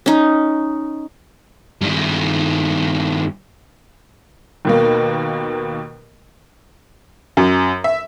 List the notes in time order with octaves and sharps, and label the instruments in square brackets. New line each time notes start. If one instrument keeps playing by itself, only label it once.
[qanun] C#4 D#4
[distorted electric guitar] G2 D#3
[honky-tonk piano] D#2 B2 A#3
F#2
E5